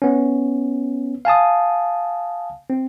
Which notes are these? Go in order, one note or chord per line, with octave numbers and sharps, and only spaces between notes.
B3 C#4
F5 G#5 A5 D#6
C4